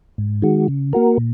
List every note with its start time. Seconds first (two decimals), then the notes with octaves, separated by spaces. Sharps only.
0.18 G#2
0.42 D#3 G#3 F#4
0.68 C#3
0.93 A#3 F#4 A#4
1.18 A#2